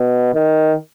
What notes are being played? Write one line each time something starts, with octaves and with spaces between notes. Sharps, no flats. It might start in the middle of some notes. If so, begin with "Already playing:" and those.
Already playing: B2
D#3